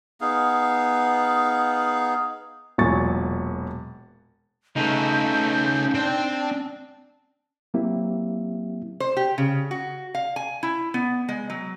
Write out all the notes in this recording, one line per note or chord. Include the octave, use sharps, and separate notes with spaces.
B3 D#4 G#4 F5
E1 A#2 F#3 G#5 C#6 A6
C#3 A3 D#4 B4 G6
C4 D4 G5
F#3 A#3 C4 E4 G4 E5
C5
G4
C#3
F#4
F5
G#5
E4
B3
G#3
F#3